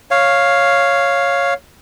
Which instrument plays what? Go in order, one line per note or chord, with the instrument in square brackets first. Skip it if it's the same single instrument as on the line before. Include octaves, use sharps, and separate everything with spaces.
[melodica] C#5 F5